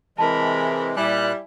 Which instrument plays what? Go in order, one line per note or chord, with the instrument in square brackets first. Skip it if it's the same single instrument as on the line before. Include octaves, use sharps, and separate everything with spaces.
[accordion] C3 E3 G#3 [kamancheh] A#4 B5 [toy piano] A5
[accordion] A#2 F#6 [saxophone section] G3 [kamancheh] E4 [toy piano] G#5